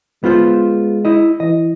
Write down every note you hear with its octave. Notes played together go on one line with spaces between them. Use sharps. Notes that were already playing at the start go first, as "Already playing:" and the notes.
G#3 B3 F4 C5
E4 D#5
E3 D#5